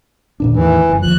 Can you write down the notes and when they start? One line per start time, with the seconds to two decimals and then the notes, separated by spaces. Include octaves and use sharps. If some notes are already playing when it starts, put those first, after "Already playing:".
0.40 D#2 A#2 D4
0.54 E2 A2 D#3 E3
0.89 F#1
1.03 D#2 F3 F#6